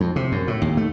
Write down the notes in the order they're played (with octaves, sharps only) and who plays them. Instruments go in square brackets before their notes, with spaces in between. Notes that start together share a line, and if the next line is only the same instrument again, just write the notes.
[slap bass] F2
C3
F#2
A2
D#2
A3